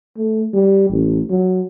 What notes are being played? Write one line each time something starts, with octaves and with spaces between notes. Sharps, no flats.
A3
G3
A1
F#3